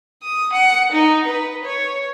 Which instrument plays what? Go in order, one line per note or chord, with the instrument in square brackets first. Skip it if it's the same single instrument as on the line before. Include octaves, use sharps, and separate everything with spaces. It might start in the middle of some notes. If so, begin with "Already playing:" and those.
[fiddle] D#6
F#5
D#4
B4
C#5